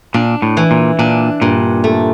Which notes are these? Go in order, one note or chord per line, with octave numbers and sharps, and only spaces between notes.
A#2 D4
A2
E3
A#2
A#2 D4
G2 A#2
A3